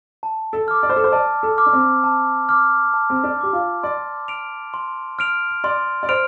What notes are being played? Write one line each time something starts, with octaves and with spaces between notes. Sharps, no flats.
A5
A4
D6 F6
D5
C5
A4
C5
D5 A5
A4
D6 F6
D4
C4
A5
D6 F6
A5
C4
D4
G4 D6 F6
F4
D5 C6
F6 D7 F7
C6
F6 D7 F7
D5 C6
D5
C5 F6 D7 F7